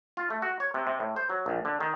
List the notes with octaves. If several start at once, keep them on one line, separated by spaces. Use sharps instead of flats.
F4
A3
F#4
C#5
C3
C3
A2
C5
F#3
A#1
D3
D#3